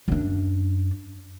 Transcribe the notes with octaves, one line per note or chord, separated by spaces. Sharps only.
F#2 D4